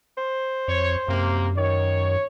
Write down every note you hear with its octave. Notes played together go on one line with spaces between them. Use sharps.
C5
F2 C#5
F#2 C3 A#3
D#3 C#5